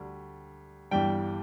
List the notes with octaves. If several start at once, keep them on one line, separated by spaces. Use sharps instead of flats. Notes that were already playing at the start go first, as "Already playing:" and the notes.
Already playing: D2 G3
G1 G2 E3 G3 G5